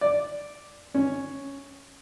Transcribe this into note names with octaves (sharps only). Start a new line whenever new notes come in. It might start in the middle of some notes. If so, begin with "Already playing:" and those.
D5
C#4